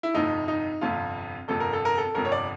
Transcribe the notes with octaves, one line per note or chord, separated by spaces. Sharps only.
E4
G1 F2 C3 D#4
D#4
G1 F2 C3 F4
G1 F2 C3 A4
A#4
A4
A#4
A4
G1 F2 C3 A#4
C#5
D5